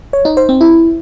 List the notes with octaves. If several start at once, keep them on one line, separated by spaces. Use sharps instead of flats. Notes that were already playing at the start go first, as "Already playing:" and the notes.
C#5
D#4
C5
C4
E4